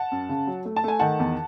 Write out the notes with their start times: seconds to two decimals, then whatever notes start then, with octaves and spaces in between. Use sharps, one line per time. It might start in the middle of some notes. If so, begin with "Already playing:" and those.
Already playing: F#5 A5
0.12 F#2
0.29 C#3
0.47 F#3
0.65 A3
0.76 A5
0.84 A3 G#5
0.99 D#3 F#5 A5
1.20 E2